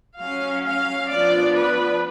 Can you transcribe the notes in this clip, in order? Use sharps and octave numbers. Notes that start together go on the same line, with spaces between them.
F#3 C#4 F5
F5
F3 B3 D4 D5
B4